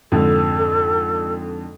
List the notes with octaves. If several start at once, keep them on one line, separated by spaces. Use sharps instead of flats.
F2 G#2 D3 A4